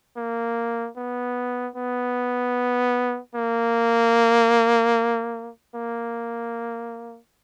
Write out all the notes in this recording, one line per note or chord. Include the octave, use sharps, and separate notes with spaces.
A#3
B3
B3
A#3
A#3